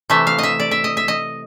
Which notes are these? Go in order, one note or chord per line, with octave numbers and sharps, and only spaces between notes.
C3 E3 A3 E5
F5
D#5 E5
D5
E5
D#5
E5
D#5